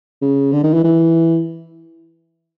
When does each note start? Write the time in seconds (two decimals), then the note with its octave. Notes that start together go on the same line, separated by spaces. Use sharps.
0.22 C#3
0.53 D3
0.63 D#3
0.74 E3
0.84 E3